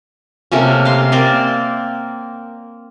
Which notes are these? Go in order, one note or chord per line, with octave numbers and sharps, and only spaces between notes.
C3 A3 A#3 C#4
F5 A#5 C6
A#3 C4 A#4 D5